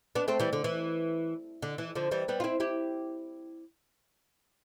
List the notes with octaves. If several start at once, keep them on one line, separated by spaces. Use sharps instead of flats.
B3 D4
A3 C4
E3 G3
D3
E3
D3
E3
D3 F3
E3 G3
G3 B3
F4
C4 E4
E4 G4